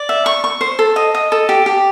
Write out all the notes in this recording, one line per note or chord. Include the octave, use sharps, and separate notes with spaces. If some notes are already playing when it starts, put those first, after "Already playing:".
Already playing: D5
E5
C#6
C#6
C5
A4
D#5
D#5
A4
G4
G4